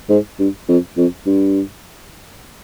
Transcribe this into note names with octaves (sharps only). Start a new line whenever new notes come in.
G#2
G2
F2
F2
G2